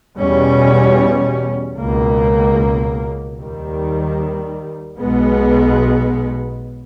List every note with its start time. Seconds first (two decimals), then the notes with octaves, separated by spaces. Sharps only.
0.17 E2 B2 G3 C#4
1.77 C#2 B2 A#3
3.38 D#2 D#3 G3
4.99 B1 B2 G#3 B3